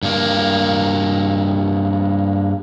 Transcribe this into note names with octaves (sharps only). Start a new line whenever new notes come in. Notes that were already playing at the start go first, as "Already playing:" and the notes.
G2 A#3